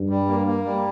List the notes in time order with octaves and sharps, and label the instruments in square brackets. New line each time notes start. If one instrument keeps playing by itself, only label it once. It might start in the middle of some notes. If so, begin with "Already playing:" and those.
Already playing: [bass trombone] G2
[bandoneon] G3
A#3
A#3
G3